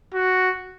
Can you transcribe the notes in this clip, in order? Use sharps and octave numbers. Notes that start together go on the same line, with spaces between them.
F#4